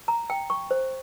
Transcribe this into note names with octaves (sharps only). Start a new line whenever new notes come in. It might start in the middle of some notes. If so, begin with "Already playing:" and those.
A#5
G5
C#6
C5